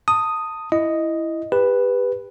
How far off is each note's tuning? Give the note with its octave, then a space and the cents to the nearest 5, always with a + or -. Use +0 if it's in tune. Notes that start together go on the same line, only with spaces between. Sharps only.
A5 +30 D#6 +0
E4 +5 D#5 +0
G4 +30 B4 +0